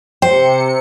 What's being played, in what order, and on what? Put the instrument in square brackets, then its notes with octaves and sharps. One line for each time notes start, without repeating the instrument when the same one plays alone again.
[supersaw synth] C3 C#7 [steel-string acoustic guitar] C5 [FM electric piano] G5